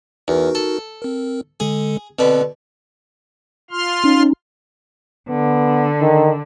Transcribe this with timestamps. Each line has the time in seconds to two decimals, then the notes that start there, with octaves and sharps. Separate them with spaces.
0.28 E2 D#4 F#4 A#4
0.55 A4
1.02 C4 A#4
1.60 D3 G#3 G#4 A4
2.19 B2 D3 C4 B4
3.71 F4 C6 F6
4.04 C#4 D#4
5.29 D3 B3
6.01 D#3